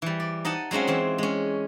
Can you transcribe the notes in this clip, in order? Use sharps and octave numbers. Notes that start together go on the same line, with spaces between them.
E3 G3
D5
D#4 D#5 F#5 A5
F#3 G#3 C4 C#4 F4
E3 C4 F4
G#3 C#4